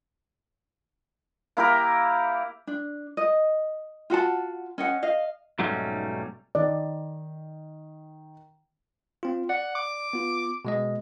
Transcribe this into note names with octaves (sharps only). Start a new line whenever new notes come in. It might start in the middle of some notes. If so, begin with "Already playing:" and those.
A#3 E4 G4 A#4
D4
D#5
F4 F#4 F#5 A5
C#4 D#5 F#5
D#5 F5
B1 G#2 F#3 G3 A3 C#4
D#3 D5
C4 F4
D5 F#5
D6
B3 F4
B2 G#3 D#5